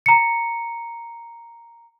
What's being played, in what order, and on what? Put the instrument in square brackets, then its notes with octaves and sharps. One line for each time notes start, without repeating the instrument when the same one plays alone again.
[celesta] A#5 C#7